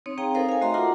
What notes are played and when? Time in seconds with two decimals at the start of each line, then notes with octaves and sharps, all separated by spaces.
0.06 C4 D#4 C#5
0.18 C4 G#4 F5 G5 A#5
0.34 D#4 A4 A#4 C5 F5
0.49 F5 G#5
0.61 A3 F#4 D#5 E5 A#5 C6
0.74 F4 F#4 A#4 F#5 A#5 D6